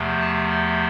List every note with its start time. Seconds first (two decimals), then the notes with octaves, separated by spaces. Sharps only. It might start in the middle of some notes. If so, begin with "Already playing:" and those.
Already playing: E2 C3 F3 A3
0.20 A5